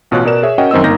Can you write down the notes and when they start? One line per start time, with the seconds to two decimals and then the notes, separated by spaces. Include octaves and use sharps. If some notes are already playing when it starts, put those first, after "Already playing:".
0.11 A1 B2 F4 C#5 F#6
0.25 B2 A#4 D5 E7
0.43 G#4 C#5 E5
0.58 C#4 F#4 A#4 D#5 F#5 G5
0.71 F#2 D#3 C4 F#4 D#5 E6
0.84 G1 A#3 D#4 A#4 G6 A#6